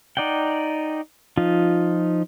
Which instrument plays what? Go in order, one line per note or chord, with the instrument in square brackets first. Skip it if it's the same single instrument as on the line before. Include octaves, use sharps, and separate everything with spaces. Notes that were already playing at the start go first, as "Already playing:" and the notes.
[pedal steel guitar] D#4 D5 F#5 G5
F3 D#4 F4